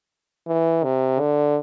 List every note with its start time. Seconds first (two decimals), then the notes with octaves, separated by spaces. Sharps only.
0.47 E3
0.84 C3
1.20 D3